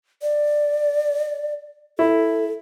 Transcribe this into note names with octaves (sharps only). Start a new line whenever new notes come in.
D5
E4 A4